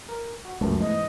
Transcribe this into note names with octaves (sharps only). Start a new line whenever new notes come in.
A#4
F#4
C#2 F#2 A3
E2 G#2 D#5